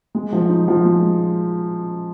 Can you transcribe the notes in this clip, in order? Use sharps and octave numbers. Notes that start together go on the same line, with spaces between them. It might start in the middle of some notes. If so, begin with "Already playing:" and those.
G#3
F3
D#4
F3
G#3